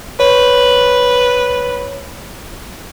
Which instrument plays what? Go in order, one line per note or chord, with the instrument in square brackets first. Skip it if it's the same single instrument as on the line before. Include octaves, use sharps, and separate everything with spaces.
[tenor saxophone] B4 [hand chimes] C#5